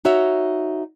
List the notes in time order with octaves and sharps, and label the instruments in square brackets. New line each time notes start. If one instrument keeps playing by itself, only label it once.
[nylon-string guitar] D#4 F#4 C#5 E5